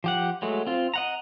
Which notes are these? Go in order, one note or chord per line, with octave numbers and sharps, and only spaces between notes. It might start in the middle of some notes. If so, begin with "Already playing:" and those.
F3 G4 F#5
F#3 G#3 A3
C4 F4
D#5 F#5 A#5